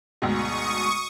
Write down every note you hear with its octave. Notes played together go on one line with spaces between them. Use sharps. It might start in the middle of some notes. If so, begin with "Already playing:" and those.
D2 G#2 B2 C#6 D#6